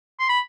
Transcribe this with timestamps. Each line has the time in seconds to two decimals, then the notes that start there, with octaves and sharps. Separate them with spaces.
0.19 C6
0.29 B5